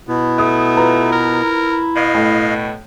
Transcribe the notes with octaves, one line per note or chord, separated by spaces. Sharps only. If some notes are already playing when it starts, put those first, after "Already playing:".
B2 B3 E4
A3 D#6
F4 B4 A#5
A#4
B2 D#5 F5
A2